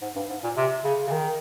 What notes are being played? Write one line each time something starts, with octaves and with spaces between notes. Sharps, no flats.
G#2
G2
G#2
A#2
C3
C#3
C#3
D#3